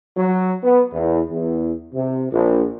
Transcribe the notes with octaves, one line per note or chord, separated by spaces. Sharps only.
F#3
B3
E2
E2
C3
A#1